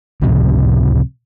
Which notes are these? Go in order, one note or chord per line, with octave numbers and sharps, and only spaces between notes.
C#2 A2 C3 F3